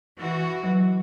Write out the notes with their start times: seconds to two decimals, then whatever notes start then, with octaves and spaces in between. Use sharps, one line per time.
0.17 E3 F#4
0.63 F#3